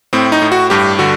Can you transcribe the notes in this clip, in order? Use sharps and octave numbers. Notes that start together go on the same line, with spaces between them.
A2 C4
D#4
A2
F#4
G2 G4
D3 F#4